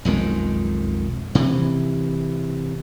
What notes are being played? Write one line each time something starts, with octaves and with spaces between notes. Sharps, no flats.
B1 F2 D#3 G#3
C3 E3